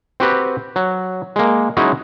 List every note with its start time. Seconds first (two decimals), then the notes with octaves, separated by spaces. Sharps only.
0.20 C4 F#4 G4 B4
0.76 F#3
1.36 G#3 A#3
1.77 F#3 G#3 C#4 D#4 E4 F#4